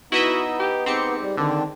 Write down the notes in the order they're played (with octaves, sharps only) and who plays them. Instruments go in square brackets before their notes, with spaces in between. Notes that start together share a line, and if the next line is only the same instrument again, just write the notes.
[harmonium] B3 D#4 [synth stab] E4 D#5 E5 [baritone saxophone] F#4
[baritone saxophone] G4
[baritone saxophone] G#2 [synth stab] C4 G4 C#7
[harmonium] G3
[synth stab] D3 [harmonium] D#3 C4 D4